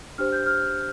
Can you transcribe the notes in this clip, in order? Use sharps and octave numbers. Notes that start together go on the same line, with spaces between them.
D4 G4 C5 F6
G6
F6